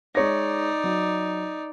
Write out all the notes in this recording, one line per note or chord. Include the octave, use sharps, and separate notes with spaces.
G#3 D#4 C#5 D5 A#6
F#3